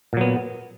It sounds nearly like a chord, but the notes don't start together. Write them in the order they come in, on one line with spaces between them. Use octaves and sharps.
A#2 F#3 B3